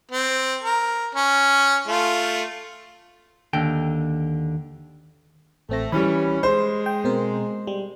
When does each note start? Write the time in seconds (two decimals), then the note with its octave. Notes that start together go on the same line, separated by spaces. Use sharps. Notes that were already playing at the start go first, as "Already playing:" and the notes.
0.11 C4
0.63 A#4
1.15 C#4
1.87 A3 F4
3.53 D#2 D3 G5
5.69 A1 A3 C4 A#6
5.92 E3 G3 C#4 B5
6.43 G#3 C5
6.86 G5
7.04 B2 C4 A#4
7.67 G3